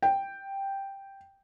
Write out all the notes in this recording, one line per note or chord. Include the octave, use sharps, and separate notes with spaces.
G5